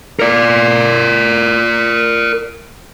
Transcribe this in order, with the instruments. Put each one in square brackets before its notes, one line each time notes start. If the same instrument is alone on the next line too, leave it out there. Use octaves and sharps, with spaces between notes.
[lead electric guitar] A#4 D5